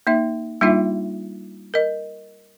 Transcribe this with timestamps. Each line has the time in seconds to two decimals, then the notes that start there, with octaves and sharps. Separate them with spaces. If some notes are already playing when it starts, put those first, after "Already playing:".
0.07 A#3 D#4 E5
0.61 G3 A#3 D4 D#4 F4 E5
1.74 A#4 D#5